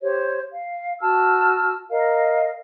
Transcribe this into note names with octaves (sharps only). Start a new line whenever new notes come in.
G4 C5 C#5
F5
F#4 A5 E6 F6
A#4 D#5 F5